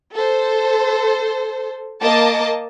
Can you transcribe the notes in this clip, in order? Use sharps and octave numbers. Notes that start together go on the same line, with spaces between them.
A4 C5
A#3 D#5 A5 D6